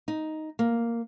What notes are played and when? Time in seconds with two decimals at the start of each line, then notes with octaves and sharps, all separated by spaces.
0.08 D#4
0.59 A#3